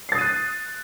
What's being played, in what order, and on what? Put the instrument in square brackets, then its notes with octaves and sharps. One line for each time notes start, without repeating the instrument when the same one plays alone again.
[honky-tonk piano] C7
A6
D#6
D#7
F#6